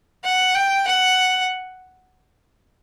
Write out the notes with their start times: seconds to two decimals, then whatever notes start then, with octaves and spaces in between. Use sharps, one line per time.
0.24 F#5
0.55 G5
0.87 F#5